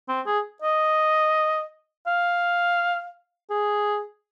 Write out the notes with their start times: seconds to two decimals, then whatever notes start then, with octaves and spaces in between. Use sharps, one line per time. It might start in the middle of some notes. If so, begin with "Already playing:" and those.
0.08 C4
0.26 G#4
0.62 D#5
2.07 F5
3.50 G#4